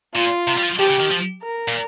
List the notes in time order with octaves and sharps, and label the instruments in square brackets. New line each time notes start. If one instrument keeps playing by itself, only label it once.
[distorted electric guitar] A#2 [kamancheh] F4
[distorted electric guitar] C3
G3
F3
[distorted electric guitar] F3 [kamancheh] G4
[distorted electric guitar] C#3
D#3
F3
[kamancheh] A#4
[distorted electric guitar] A#2